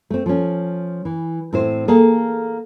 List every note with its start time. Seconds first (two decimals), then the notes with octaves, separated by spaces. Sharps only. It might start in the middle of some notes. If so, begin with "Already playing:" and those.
0.10 A3 C4
0.26 F3 C#4
1.05 E3
1.53 A2 C4 E4 C5
1.88 A#3 G#4 A4 F5